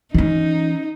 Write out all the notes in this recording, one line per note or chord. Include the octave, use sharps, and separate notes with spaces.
E3 C#4 D#4